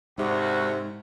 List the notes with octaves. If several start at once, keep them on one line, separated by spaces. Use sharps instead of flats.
D2 G#2 C3 F#4